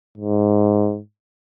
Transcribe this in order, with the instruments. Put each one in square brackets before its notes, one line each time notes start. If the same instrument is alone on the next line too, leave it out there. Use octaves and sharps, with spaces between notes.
[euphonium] G#2